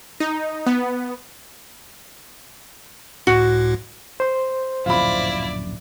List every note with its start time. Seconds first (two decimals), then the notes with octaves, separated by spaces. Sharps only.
0.20 D#4
0.66 B3
3.27 C#2 A2 F#4
4.20 C5 C6
4.86 D1 A#1 F#2 E4 F4 D5 B5